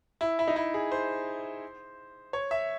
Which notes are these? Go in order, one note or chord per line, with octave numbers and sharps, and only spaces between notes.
E4
E4
D#4
E4
G#4
C5
C#5
E5